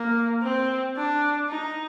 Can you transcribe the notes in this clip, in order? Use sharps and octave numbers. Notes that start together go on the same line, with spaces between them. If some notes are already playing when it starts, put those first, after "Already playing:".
Already playing: A#3
C4
D4
D#4